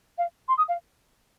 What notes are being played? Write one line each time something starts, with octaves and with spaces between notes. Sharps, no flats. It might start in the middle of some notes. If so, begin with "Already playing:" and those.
F5
C6
D#6
F5